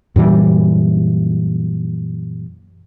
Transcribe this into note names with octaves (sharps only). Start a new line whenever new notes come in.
F#2 A#2 E3 G3